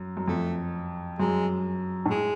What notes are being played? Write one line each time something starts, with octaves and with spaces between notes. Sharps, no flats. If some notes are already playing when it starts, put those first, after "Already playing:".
Already playing: F#2
F#2
F2 A3
F#2 G#3
A2
G#3